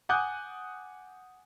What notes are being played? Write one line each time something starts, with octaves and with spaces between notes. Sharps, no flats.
F#5 G#5 D6 D#6 F#6 G6